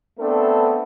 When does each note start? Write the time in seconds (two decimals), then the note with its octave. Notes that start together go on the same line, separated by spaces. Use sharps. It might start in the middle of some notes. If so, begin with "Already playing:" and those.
0.19 A3 B3 C4 D4 A4